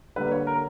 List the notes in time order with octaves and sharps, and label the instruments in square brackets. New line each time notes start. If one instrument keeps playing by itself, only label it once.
[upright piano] D3 G3 A#3 B4
C#5
A#4